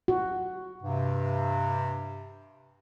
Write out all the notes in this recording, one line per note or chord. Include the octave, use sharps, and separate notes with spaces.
F#4
G2 C3